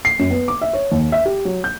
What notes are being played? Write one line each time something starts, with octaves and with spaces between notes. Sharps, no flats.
C7
F#2
B3
D6
E5
C#5
D#2
E5
G4
F#3
G6